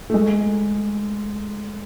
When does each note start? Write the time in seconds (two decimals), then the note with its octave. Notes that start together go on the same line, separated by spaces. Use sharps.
0.10 A3
0.14 G#3